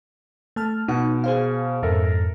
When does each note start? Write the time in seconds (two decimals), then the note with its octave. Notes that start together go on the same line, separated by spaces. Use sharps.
0.56 A3 A5 F6
0.88 B2 D#4 F#5
1.24 G#4 C5 F5
1.83 F2 G#2 A4 A#4 E5